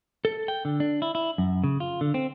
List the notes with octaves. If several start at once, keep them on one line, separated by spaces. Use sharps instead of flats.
A4
G5
D3
D4
E4
E4
F#2
C#3
F4
D3
C4